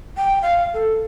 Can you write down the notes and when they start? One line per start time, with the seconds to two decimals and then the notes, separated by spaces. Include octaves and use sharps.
0.17 G5
0.42 F5
0.74 A4